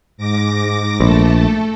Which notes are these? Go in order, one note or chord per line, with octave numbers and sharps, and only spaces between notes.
G#2 D6 A#6
A#1 A3 A4